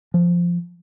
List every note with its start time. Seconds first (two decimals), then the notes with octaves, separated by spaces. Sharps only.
0.14 F3